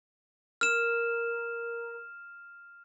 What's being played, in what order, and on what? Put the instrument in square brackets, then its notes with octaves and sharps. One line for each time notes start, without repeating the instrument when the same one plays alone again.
[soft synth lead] A#4 [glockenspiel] F6 E7